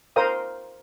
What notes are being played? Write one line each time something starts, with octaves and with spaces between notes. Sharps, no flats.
A#4 C5 F5 G5 D#6